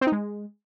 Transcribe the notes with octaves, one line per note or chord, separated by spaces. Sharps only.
C4
D#4
G#3